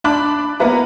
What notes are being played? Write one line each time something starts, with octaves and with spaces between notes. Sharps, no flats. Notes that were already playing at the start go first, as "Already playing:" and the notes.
D4 A5 B5 D6 F#6
A#3 B3 E4 B4 A#5